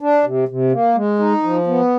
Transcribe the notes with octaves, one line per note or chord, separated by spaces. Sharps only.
D4
C3
C3
A#3
G#3
D#4
F3
B3